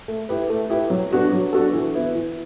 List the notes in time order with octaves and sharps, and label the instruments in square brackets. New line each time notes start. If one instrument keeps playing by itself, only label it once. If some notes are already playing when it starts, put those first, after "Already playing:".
[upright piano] A3
E4 G4 B4
A3
E4 G4 B4
F#3
B3 D4 F#4 A4
F#3
B3 D4 F#4 A4
E3
B3 E4
E3